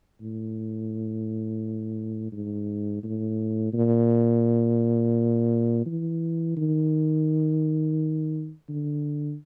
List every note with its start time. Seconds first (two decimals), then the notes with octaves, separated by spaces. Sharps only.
0.21 A2
2.32 G#2
3.03 A2
3.73 A#2
5.86 E3
6.57 D#3
8.69 D3